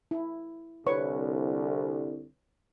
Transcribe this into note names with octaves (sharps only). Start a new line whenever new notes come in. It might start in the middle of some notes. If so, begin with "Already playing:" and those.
E4
C2 D3 B4 C#5 C#6